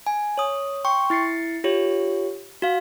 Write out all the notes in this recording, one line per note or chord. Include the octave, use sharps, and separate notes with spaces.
G#5
C#5 D#6
G5 C6 C#6
E4 A6 C7 C#7
F4 G4 C#5
F#4 F5